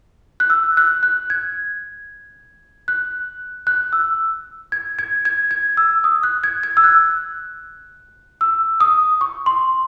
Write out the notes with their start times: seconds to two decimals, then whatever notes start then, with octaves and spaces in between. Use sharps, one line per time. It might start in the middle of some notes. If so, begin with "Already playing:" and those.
0.40 F#6
0.50 E6
0.77 F#6
1.03 F#6
1.30 G#6
2.88 F#6
3.67 F#6
3.93 E6
4.72 G#6
4.99 G#6
5.25 G#6
5.51 G#6
5.77 E6
6.04 D#6
6.23 F#6
6.44 G#6
6.63 G#6
6.77 E6
6.84 F#6
8.41 E6
8.80 D#6
9.21 C#6
9.46 C6